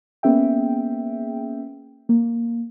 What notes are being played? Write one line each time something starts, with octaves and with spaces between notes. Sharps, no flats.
A#3 B3 C#4 G#4 E5 G5
A#3